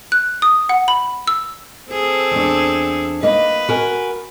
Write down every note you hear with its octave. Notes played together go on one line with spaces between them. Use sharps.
F#6
D#6
F#5
B5
E6
C4 G#4 A4
E2 D4
A#3 B4 D#5
F#4 A#4 G#5